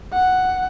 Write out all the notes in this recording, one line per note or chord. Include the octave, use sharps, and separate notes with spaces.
F#5